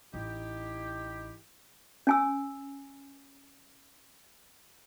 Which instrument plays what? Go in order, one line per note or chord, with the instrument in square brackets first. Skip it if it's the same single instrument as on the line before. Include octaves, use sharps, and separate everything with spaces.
[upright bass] A1 [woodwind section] D#4 E4 G4
[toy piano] C#4 G#5 E6